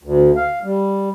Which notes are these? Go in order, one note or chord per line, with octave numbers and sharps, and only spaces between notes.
D2
F5
G3